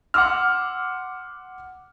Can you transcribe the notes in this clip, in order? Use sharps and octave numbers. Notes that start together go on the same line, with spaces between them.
F#5 C6 D6 E6 F6